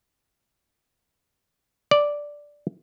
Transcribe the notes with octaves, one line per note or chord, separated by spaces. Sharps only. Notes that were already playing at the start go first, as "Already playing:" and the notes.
D5